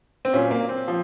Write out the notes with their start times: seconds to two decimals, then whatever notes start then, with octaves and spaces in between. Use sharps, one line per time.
0.25 C4
0.33 A#2 F#3 C#4
0.51 A#3
0.69 C4
0.88 F3